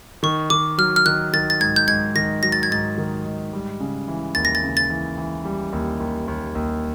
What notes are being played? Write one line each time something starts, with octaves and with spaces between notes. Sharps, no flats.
D#3 C#6
D#3 D6
F#3 F6
F6
D#3 F#6
D#3 A6
A6
G#2 G#6
G6
G#2 G#6
D#3 A#6
F#3 A#6
A6
G#6
G#2 A6
D#3
G#2
G3
C#3
E3
D#2 A6
A#6
A6
C#3
A6
E3
E3
G3
D#2
D#2
D#2
D#2